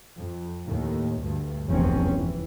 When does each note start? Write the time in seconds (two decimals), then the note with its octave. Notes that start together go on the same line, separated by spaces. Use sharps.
0.18 F2
0.66 D#2 A2
1.22 D2 G2
1.70 F1 B1 E2 G2 C4 C#4
2.14 E3